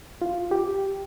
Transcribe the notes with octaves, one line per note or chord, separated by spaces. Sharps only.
F4
G4